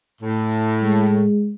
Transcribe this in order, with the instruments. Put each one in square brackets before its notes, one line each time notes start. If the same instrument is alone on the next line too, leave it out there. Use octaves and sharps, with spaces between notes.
[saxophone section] A2
[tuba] G#3